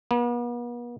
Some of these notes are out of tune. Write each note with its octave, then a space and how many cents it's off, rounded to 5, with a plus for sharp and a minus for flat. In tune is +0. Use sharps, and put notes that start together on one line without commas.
B3 -45